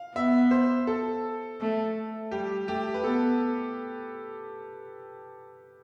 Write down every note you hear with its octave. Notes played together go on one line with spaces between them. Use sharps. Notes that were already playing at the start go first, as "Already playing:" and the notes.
Already playing: F5
B3 E5
C5
A4
A3
G3 G4
A3 G4
B4
B3 A4